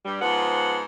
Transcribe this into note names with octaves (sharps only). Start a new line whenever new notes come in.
G2 G3
G#2 F3 B3 C5 F#5